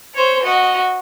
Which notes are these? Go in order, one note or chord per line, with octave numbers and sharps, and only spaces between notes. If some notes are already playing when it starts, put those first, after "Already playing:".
C5 C#5
F#4 D#5